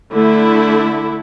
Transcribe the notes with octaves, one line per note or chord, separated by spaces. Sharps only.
D3 A3 E4